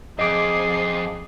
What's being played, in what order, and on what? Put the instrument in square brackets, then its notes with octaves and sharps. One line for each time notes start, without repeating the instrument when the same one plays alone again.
[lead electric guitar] F2 [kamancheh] G#4 [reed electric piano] D#5 D6 [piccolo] C7